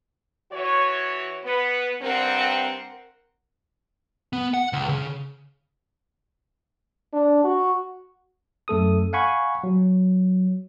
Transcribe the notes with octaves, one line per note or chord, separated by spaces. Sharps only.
E3 F#4 C#5
B3 B4
G2 C4 A#4 F#5
B3
F#5
C#2
C#3
D4
F#4
F#2 A3 A4 D#6
F5 F#5 G#5 B5 C#6
F#3